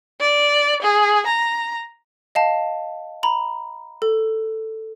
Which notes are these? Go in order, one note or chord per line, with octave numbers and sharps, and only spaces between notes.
D5
G#4
A#5
D#5 F5 A5
A#5 B5
A4